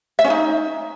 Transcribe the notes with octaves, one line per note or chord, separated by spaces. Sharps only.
E5
C#4
D#4